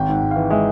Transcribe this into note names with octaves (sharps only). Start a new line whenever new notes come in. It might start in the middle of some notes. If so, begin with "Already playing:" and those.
Already playing: G#1 G5
G#2 F#5
G#2
E3 F5
G#3 E5